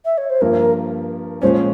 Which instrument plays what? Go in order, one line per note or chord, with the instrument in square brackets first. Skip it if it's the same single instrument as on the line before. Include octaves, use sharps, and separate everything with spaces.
[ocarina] E5
C#5
C5
[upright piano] G2 F3 A#3 [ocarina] A#4
[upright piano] A#2 F3 G#3 C#4 [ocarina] C5